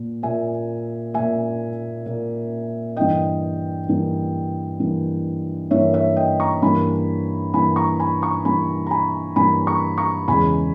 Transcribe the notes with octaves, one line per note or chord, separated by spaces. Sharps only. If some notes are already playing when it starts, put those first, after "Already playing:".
Already playing: A#2 A#3
A#2 A#3 E5 G#5
A#2 A#3 E5 G#5
A#2 A#3
G2 E3 A#3 D#5 G5
G2 E3 A#3
G2 E3 A#3
G2 E3 A#3 C#5 E5
C#5 E5
D#5 G5
A#5 C#6
G2 E3 A#3 G#5 B5
G2 E3 A#3 G#5 B5
A#5 C#6
G#5 B5
A#5 C#6
G2 E3 A#3 G#5 B5
A#5
G#5 B5
G2 E3 A#3 G#5 B5
A#5 C#6
A#5 C#6
E2 C#3 G#3 G#5 B5